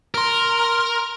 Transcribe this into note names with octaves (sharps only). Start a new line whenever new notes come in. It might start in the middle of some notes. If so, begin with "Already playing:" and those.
A#4 C6 F6